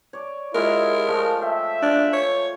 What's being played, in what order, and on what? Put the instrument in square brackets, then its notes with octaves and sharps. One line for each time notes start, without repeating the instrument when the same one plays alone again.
[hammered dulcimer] C#5 D5
[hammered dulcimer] G#3 F4 [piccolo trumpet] E4 [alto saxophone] A#4
[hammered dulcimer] F3 A3 F4
[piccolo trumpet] E5 [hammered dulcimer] G5
[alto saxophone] D4
C#5